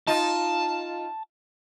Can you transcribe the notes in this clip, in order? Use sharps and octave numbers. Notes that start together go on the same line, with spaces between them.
D#4 F4 A5